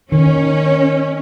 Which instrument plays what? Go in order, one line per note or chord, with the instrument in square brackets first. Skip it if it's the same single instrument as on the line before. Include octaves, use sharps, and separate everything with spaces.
[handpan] D#3 [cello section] C#4